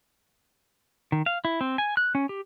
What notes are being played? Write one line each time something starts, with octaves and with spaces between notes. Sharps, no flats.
D#3
F5
E4
C4
G#5
F#6
C#4
G4